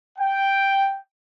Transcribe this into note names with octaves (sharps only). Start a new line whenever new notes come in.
G5